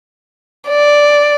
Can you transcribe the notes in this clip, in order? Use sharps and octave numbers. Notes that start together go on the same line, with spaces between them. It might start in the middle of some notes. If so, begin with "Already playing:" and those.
D5